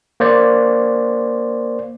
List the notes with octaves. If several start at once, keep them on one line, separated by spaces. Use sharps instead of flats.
A#3 C5 D5